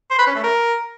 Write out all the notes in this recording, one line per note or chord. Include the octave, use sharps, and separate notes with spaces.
C5
B4
C#4
A3
A#4